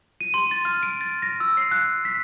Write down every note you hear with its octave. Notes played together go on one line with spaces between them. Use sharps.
D#7
C6
A6
F6
D7
A6
A#6
E6
C7
F#6
B6